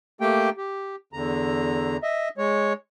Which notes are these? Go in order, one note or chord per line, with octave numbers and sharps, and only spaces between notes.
A3 A#3 G4 G5
G4
E2 D3 A#5
D#5 E5
G#3 C#5